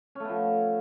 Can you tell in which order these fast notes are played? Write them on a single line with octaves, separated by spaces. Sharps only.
C#4 A3 B3 F3